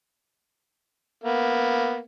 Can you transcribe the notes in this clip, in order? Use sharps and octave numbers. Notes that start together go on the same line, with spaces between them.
A#3 B3